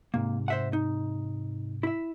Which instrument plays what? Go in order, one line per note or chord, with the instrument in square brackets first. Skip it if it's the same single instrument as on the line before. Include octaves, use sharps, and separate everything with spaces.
[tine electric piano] G#2 C3 [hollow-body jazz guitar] A#3
[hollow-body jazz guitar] C5 E5 F#5
D#4
E4 E5